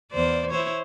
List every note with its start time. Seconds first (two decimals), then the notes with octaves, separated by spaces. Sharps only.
0.12 E2 C5 D5
0.50 E4 C5 C#5